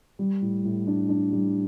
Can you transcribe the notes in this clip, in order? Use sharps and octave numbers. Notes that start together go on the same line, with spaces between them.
G3
A2
A2
D4
D4
G3